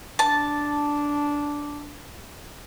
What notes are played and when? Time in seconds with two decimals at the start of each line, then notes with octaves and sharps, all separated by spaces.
0.19 D4 A5